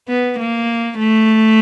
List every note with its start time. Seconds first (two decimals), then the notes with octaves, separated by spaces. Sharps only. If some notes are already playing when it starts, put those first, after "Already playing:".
0.08 B3
0.39 A#3
0.99 A3